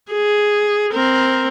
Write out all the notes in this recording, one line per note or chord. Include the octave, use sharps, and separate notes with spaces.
G#4
C4 A#4